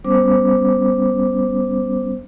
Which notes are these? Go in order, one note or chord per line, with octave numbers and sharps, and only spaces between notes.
G3 B3 C#4 C5 D6